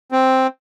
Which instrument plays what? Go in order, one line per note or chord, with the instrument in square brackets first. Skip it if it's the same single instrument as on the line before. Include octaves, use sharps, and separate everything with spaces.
[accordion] C4